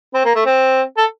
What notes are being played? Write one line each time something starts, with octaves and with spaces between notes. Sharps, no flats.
C4
A#3
A3
C4
A4